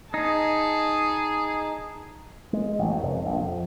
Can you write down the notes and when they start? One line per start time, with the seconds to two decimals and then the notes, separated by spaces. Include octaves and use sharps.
0.14 D#4 G#4 A5
2.53 G#3
2.79 A1
2.91 F#2
3.03 F1
3.26 A#1
3.40 F2